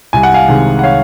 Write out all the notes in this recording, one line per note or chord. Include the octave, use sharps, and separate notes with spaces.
C2 G#5
F#5
F5 G#5
C3 D#3 G#3
F#5
C#5 F5